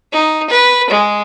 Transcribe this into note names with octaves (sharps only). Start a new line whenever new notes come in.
D#4
B4
G#3